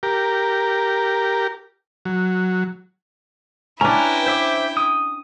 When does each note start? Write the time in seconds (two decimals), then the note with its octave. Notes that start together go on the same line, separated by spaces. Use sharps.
0.03 G4 A#4
2.05 F#3
3.81 C#4 D4 E4 B4 G5 A#5
4.27 C5 E5 D6
4.77 D#6